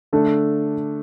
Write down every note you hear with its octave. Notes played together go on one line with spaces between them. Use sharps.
D3 A3 D4 A4